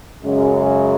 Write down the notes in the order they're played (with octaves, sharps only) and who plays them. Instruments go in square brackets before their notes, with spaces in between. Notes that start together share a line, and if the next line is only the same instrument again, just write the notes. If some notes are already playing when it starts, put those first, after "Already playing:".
[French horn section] F#2 C#3 G#3